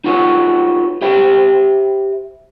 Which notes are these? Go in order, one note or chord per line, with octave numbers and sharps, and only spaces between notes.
D#4 F4 F#4 A4 B4 C#5
G4 C5 E5 G5 B5